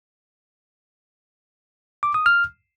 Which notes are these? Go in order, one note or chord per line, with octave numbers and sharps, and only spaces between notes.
D6
D#6
F6